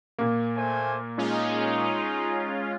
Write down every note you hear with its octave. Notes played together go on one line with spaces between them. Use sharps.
A#2 A#3
A3 C5 G#5
G#3 C#4 D#4 F4 G#4